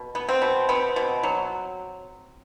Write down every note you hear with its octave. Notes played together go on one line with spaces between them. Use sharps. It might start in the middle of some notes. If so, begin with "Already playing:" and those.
Already playing: B2
B3
C4
B2
B3 C4
B2
F#3